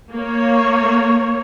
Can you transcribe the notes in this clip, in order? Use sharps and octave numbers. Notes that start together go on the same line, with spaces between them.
A#3 C#5